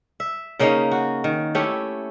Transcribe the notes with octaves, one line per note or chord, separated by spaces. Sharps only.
E5
C#3 A#3 C#4 D#4
F#4
D#3
A3 C#4 E4 G4